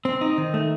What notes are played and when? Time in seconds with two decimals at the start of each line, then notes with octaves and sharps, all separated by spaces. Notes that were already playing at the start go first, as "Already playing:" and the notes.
0.05 C4
0.21 D#4
0.38 D#3
0.54 A3